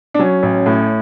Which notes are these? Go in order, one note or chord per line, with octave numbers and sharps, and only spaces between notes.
D4
F#3 C#4
A1
A2